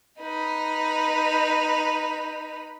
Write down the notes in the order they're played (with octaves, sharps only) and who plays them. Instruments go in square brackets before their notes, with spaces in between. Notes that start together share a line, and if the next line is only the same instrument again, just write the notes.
[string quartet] D#4 B4